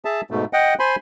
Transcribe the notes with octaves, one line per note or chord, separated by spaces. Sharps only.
G#4 E5 A5
G#2 B2 A3
D#5 F#5 G5
C5 G#5 B5 C6